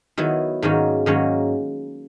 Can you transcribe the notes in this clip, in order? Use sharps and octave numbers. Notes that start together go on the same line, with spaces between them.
D#3 F#3 B3 E4
G#2 D#3 F#3 A#3 C#4
G#2 D#3 F#3 A#3 C#4